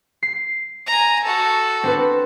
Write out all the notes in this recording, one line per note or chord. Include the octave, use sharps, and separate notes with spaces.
C7
G#5 A#5
F#4 A4
C4 D4 B4